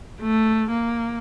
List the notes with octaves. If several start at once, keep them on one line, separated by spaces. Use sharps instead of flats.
A3
A#3